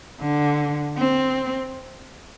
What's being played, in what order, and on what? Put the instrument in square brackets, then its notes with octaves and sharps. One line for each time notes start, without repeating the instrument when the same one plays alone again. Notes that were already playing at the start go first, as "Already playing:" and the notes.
[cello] D3
C4